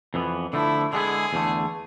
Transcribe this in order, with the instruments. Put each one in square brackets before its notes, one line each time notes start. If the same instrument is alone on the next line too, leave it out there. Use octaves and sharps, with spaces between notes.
[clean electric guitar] F2 E3 B3
[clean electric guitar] D3 F3 A3 [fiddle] E4
[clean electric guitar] D3 G#3 B3 E4 [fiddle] G#4
[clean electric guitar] E2 D3 A3